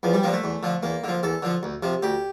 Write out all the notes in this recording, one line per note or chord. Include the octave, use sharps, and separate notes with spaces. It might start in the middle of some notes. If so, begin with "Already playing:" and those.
E2 F3
G3
D3 F3 A#3
A3
E2
D3 F3
E2 A#3
D3 F3
E2 A4
D3 F3
D2
C3 F3
D2 G4